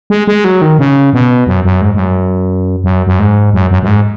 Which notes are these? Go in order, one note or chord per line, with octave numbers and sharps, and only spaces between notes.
G#3
G#3
F#3
D#3
C#3
B2
F#2
F#2
G#2
G#2
F#2
F#2
F#2
G#2
F#2
F#2
F#2
G#2